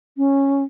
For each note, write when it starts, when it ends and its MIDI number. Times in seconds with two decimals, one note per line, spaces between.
0.17 0.63 61